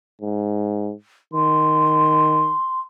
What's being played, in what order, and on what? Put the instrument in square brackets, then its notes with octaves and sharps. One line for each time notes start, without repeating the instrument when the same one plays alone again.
[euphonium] G#2
[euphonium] D#3 [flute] C6